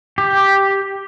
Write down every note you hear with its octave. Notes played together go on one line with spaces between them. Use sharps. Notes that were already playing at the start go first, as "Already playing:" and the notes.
G4